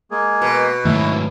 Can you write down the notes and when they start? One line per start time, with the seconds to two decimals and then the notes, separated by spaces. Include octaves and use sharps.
0.11 G#3 A#3 G#4
0.42 B2
0.85 G#2 D#3 F#3 A3 E4